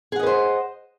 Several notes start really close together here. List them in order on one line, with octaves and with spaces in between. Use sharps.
G#4 F#5 D#5 B4 C5